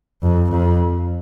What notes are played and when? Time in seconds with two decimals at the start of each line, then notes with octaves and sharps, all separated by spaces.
0.23 F2
0.51 F2